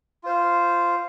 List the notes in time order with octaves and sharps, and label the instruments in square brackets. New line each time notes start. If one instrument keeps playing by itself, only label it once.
[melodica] F4 C5 F5